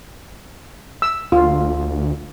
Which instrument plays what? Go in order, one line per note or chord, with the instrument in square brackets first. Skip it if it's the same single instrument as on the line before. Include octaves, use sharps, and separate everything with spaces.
[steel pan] E6
[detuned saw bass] D2 [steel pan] F4